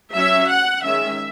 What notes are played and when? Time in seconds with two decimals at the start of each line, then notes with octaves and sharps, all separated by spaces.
0.15 F#3 C#4 E5
0.50 F#5
0.85 D#3 G#3 C#4 E5